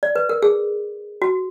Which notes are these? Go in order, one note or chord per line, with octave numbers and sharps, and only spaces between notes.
D5
B4
A#4
G#4
F#4